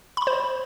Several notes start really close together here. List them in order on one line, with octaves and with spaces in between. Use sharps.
B5 C6 C5